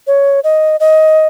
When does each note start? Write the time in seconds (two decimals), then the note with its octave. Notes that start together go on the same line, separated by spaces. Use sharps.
0.07 C#5
0.44 D#5
0.80 D#5